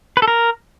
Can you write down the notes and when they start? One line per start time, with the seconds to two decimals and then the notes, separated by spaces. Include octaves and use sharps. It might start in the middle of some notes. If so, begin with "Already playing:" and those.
0.17 B4
0.22 A4
0.28 A#4